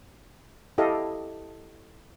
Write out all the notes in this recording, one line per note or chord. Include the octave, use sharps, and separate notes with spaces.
E4 G4 A4 D#5 F5